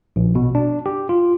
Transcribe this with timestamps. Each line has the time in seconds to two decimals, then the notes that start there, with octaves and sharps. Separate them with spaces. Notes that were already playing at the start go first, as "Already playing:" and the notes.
0.16 A#1
0.35 B2
0.55 D4
0.86 G4
1.09 F4